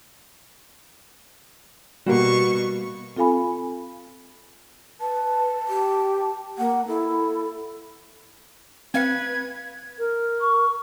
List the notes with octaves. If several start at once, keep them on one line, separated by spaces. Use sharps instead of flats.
B2 G3 A#3 F#4 C#6
C4 F4 A4 F5 G#5 B5
B4 A5
G4
A#3 F#5
E4 A4
C4 B4 F5 G#6 C#7
A#4
C#6